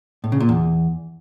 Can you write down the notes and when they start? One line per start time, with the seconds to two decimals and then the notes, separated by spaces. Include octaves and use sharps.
0.24 A2
0.32 C#3
0.40 A#2
0.49 E2